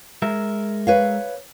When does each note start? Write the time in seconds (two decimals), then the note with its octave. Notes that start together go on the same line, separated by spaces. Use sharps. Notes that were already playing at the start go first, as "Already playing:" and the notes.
0.22 G#3 A#4 E5
0.87 B4 C#5 F5